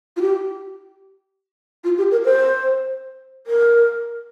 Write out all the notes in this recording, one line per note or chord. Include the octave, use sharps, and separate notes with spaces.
F4
G4
F4
G4
A#4
C5
A#4